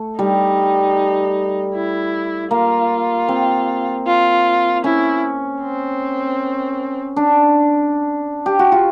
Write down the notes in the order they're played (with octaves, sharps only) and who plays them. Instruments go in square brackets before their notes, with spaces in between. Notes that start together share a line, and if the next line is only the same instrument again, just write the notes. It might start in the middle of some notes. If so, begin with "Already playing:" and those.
Already playing: [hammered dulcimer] A3
[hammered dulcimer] G3 [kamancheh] D#4
[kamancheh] E4
[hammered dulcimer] A#3 [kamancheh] F4
[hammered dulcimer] C4
[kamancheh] F4
[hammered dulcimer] C#4 [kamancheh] E4
[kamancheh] C4
[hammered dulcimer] D4
G4
F#4
F4